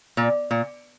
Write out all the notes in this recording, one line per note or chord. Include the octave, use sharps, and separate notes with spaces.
A#2
A#2